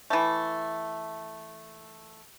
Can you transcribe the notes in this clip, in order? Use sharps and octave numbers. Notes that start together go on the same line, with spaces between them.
E3 A3